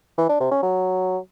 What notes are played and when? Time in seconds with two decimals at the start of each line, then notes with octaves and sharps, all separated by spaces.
0.18 E3
0.29 D4
0.40 C3
0.52 C#4
0.63 F#3